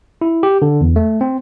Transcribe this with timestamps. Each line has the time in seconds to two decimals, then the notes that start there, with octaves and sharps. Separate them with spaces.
0.21 E4
0.43 G4
0.62 D3
0.81 E2
0.96 A3
1.21 C4